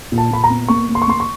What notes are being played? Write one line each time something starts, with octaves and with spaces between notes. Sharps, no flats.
A#2
A5
A#2 B5
A#5
B3
A#3 C#6
A#3
C6
C#6
A#3 C6
C#6